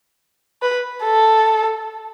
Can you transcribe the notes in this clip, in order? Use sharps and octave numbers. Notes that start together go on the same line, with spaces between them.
B4
A4